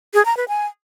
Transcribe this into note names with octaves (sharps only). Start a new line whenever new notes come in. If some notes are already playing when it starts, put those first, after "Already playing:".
G#4
A#5
B4
G#5